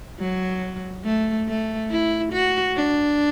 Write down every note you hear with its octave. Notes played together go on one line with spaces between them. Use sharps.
F#3
A3
A3
E4
F#4
D4